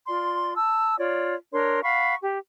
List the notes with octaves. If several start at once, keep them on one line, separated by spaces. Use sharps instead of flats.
F4 D5 C6
A5 E6
F4 C#5 D5
D4 A#4 C#5 C6
F5 F#5 B5 C#6
G4